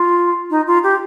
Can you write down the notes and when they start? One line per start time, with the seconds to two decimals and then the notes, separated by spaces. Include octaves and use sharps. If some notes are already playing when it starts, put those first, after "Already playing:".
Already playing: F4
0.50 D#4
0.67 F4
0.83 G4